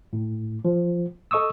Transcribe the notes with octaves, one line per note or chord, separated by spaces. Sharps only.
A2
F3
A4 D#5 C#6 D#6 E6